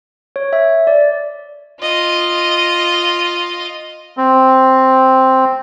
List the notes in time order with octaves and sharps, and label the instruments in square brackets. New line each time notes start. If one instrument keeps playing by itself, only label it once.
[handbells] C#5
E5
D5
[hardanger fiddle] F4 D#5
[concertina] C4